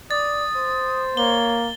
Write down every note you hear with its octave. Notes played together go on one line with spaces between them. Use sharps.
D5 D#6 A6
C5
A#3 C#5 G7